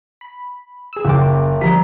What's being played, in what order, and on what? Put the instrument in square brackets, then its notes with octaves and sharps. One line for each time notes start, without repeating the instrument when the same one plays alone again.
[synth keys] B5
G#4 E6
[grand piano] F#1 G5 [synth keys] C#3 F4 D6
[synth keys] D3 F3 G3 [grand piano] A#5 B6